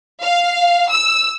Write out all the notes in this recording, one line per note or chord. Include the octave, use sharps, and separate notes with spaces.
F5
E6